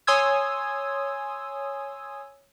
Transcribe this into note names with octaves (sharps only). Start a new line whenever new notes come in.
C#5 G#5 C6 D#6 E6 G#6